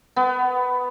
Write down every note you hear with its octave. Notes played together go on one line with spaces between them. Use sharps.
B3